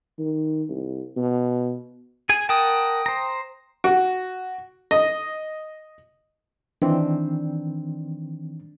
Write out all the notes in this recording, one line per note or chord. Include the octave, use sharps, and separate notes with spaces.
D#3
C2
B2
G#4 G#5
A#4 F#5 G5 A5 D#6
C5 A#5
F#4
D#5
D#3 E3 C4 D4